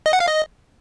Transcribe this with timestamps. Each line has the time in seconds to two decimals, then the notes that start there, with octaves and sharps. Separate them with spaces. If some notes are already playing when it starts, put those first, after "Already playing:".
0.06 D#5
0.13 F#5
0.20 F5
0.28 D#5